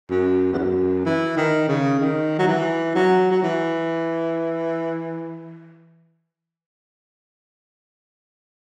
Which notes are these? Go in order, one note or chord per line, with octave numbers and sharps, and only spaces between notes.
F#2
E2
F#2
E3
D#3
C#3
D#3
F#3
E3
F#3
F#3
E3